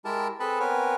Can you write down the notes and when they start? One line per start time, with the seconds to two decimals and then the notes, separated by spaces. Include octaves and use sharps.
0.05 G#3 E4 G4 A#4 A5
0.40 C4 G#4 A4 B4 A5 B5
0.60 B3 C4 A#4 B4 C#5 G#5